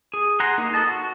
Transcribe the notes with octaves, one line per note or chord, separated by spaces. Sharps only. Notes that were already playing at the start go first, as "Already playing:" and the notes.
G#4
G#4 F#5 A#5 C6
A#3 D#4
B3 F#4 A4 D#5 A5
F#4